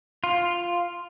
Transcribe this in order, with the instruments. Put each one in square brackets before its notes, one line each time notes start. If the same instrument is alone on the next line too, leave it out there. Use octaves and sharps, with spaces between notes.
[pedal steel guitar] F4